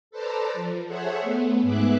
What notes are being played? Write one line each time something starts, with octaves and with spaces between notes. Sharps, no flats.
A4 B4 C5 D5 A5 A#5
F3
G#4 A4 C5 C#5 E5 F#5
A3 B3
G#2 B3 G#4 E5 D6 F#6